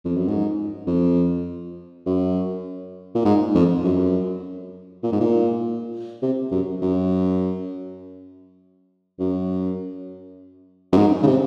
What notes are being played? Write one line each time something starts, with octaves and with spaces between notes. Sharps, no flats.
F2
F#2
G#2
F2
F#2
A#2
G#2
F2
F#2
A#2
G#2
A#2
C3
F#2
F#2
F#2
F#2
G#2
C#3
C3